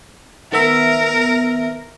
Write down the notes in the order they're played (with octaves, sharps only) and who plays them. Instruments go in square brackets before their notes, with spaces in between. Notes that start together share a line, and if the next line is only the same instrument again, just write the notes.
[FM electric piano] D#3 B3 E5 [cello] A#4